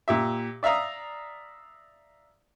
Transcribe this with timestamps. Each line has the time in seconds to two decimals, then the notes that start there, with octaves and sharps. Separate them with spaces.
0.08 A#2 G4 E5
0.63 D5 E5 F5 A#5 D#6